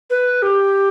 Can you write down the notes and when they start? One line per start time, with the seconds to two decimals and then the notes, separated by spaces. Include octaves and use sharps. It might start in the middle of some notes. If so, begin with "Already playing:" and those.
0.10 B4
0.42 G4